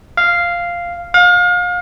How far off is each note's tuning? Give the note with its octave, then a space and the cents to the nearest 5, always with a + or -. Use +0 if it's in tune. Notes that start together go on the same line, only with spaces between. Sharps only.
F5 -5
F5 +35